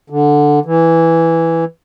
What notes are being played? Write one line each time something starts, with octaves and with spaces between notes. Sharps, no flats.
D3
E3